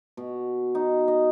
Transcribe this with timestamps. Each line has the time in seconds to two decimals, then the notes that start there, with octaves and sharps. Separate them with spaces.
0.17 B2
0.75 D#4
1.08 D#5